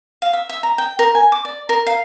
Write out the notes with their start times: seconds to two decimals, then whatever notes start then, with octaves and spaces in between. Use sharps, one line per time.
0.22 F5
0.33 E5
0.49 E5
0.63 A#5
0.78 G5
0.99 A#4
1.15 G#5
1.32 D6
1.45 D5
1.69 A#4
1.87 F5